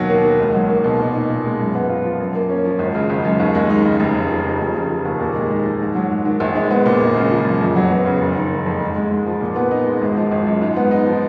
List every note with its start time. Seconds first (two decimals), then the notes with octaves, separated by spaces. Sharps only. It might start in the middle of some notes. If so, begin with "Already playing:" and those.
Already playing: D#2 B2 F#3
0.09 A#3
0.24 D#3
0.39 C#2
0.54 F#3
0.70 A#3
0.84 B2
0.99 A#2
1.14 D#4
1.29 A#2
1.45 G#3
1.60 F#2
1.74 B3
1.89 F4
2.04 F3
2.20 F#2
2.35 A#3
2.49 C#4
2.65 F3
2.79 G#1
2.95 C#3
3.10 G#1
3.25 F#2
3.40 D#2
3.55 G#3
3.70 D#4
3.85 C#3
4.00 F1
4.15 C#3
4.30 F3
4.45 F2
4.60 F1
4.75 C#3
4.90 F3
5.05 D#2
5.20 A#2
5.35 G#3
5.51 D#4
5.65 F3
5.80 G#2
5.95 F#3
6.10 G#2
6.25 D#3
6.40 A#1
6.55 G#3
6.70 B3
6.86 A#2
7.00 G#1
7.16 C#3
7.31 F3
7.45 F#2
7.60 F2
7.76 F#3
7.91 B3
8.06 C#3
8.21 F#1
8.36 D#3
8.51 A#3
8.66 F2
8.81 G#2
8.96 G#3
9.11 G#2
9.26 F3
9.41 A#2
9.56 B3
9.71 D#4
9.86 G#3
10.01 G#1
10.16 F3
10.31 G#1
10.46 F#2
10.61 G#2
10.76 B3
10.91 D#4
11.07 F3